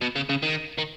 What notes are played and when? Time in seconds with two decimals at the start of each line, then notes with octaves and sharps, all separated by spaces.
0.02 B2
0.16 C#3
0.29 C#3
0.42 D#3
0.78 D#3